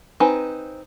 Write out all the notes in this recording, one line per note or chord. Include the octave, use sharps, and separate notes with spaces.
C4 D#4 B4 G#5